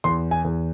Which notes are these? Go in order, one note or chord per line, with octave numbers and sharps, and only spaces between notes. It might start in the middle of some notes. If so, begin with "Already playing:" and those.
E2 C6
G#5
E2